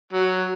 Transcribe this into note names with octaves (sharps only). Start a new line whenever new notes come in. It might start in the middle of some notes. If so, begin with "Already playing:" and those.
F#3